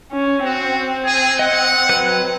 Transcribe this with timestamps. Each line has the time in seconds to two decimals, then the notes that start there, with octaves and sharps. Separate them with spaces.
0.12 C#4
0.45 C4 F#4
1.06 G#4
1.39 D#5 F#5
1.89 F#3 B4 F#6